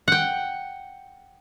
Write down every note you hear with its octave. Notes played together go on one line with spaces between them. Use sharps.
F#5 G5